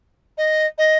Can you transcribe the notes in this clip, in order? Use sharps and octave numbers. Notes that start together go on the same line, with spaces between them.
D#5
D#5